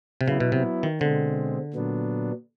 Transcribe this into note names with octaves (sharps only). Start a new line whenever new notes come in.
C3
C#3 F#3 B3 E4
B2
C3
D#3
B2 D3 G#3 C4
A#2 F#3 B3 D4